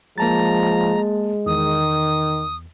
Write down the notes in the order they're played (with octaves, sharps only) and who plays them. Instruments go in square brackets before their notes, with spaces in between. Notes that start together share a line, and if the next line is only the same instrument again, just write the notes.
[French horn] F3 [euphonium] G#3 [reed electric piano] A#3 A5 A6 [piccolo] A#5
[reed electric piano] E2 [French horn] D#3 [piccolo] D#6